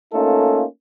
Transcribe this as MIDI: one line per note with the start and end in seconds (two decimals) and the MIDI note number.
0.13 0.64 57
0.13 0.64 58
0.13 0.64 61
0.13 0.64 63
0.13 0.64 65
0.13 0.64 69